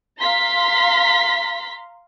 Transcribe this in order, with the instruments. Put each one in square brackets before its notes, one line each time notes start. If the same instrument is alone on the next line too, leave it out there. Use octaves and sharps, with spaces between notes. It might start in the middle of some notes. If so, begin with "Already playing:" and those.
[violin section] F5 A#5 C6 B6